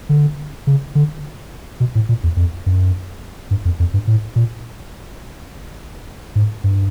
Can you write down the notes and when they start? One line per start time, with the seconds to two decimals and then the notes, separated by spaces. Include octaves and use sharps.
0.09 D3
0.67 C#3
0.95 D3
1.80 B2
1.95 A2
2.09 A#2
2.24 E2
2.37 F2
2.66 F#2
3.51 G2
3.65 F2
3.80 F2
3.94 G2
4.07 A2
4.36 A#2
6.35 G#2
6.64 G2